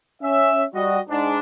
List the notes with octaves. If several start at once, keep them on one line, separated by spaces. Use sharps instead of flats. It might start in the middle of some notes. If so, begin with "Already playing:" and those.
C#4 E5
G3 F#4 D#5
G#2 D4